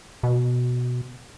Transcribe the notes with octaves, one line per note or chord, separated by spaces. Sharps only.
B2